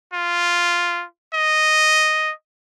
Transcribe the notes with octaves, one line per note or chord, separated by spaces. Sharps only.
F4
D#5